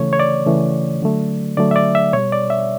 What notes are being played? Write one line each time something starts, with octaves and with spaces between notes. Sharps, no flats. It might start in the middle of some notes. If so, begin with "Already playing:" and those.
Already playing: C#3 E3 A3 C#5
C#5
D5
C#3 E3 A3
D3 F#3 A3
D3 F#3 A3 D5
E5
D5
E5
B2 G3 C#5
D5
E5